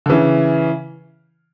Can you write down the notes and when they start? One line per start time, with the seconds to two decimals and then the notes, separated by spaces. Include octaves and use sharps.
0.06 D3
0.10 C#3 E3